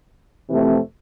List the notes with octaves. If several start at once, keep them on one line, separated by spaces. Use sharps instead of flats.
F2 C3 E3 A3 C4